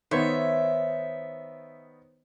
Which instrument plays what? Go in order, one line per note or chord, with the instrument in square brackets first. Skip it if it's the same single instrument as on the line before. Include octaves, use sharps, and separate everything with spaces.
[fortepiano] D#3 B3 [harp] C5 C#5 [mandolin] E5